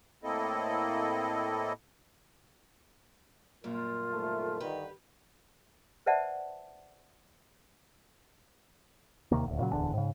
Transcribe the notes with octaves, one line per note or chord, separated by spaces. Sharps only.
A2 A#3 C4 E4 A4 D#5
F#2 A#2 G3 F4 A#4
C2 D#3 A3
G2 D3 D#3 G4 B4
B4 C5 D5 E5 F#5 A5
D#2 C3 D#3 A#3
D#1 D2
A#2 C#3 F#3
D1 E2 D3 D4
G#2 C#3